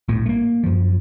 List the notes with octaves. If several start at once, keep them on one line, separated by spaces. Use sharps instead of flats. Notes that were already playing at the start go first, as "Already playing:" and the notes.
A#1 A2
A3 A#3
F#2 F3